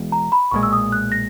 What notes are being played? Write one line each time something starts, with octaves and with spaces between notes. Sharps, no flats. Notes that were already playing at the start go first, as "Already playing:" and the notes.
Already playing: E1 E2 B2 G#3
A#5
B5
B1 A#2 G#3 C#6
E6
D#6
F#6
A#6